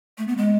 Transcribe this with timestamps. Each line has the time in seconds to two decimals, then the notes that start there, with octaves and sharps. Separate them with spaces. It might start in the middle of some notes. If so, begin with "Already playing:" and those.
0.18 A3
0.28 B3
0.37 G#3